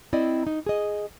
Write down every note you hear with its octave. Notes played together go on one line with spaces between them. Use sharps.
C4 E4 D5 D#5
D#4
G#4 D#5